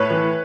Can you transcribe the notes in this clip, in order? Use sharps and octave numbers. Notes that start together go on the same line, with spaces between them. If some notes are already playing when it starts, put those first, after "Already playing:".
Already playing: A2 B4 C#5
E3